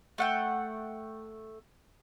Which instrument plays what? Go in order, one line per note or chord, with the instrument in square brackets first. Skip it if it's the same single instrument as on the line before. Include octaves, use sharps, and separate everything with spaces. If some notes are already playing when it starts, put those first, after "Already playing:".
[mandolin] A3 F#5 G5